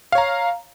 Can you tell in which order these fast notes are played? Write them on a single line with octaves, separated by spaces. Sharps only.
F5 C#5 A#5